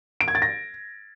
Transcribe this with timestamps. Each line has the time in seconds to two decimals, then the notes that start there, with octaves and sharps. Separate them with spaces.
0.21 D7
0.28 G#6
0.35 A6
0.42 A#6